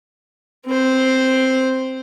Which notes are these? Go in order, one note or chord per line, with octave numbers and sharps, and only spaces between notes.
C4 C5